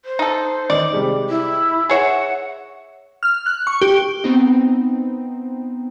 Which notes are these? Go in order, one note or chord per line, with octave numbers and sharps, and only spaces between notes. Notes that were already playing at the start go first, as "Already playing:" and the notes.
C5
D#4 A4
D#3 D#4 D5
C3 G3 G#3
E4
G#4 C#5 E5 F#5 E7
F6
F#6
C#6
G4
B3 C4 D#4